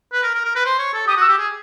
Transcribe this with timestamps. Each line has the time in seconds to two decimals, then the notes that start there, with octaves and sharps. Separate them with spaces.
0.13 B4
0.23 A#4
0.34 A#4
0.45 A#4
0.55 B4
0.65 C5
0.79 C#5
0.94 A4
1.07 G4 D#6
1.17 F#4 E6
1.28 G4
1.38 G#4